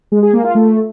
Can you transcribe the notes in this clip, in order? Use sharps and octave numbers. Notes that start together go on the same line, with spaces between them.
G#3
G#4
A#3
F4
A3